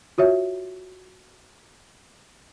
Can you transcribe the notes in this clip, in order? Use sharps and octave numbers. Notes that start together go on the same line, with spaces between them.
F4 F#4 C#5 E5